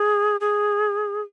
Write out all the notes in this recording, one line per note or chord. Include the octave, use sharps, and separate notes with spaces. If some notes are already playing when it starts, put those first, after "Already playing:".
Already playing: G#4
G#4